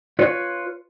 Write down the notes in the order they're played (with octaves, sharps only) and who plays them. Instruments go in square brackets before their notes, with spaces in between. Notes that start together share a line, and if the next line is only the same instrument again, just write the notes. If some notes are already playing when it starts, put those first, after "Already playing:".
[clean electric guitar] F4 B4 C#5